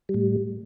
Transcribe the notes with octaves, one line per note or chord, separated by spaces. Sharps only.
G3
A2